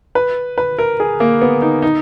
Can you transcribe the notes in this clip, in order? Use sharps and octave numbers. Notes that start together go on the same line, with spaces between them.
B4
B4
A#4
G#4
A#3
B3
D#4
D#4